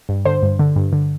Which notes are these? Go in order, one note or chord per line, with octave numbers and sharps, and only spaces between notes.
G2
D3 C5
G2
D3
G2
D3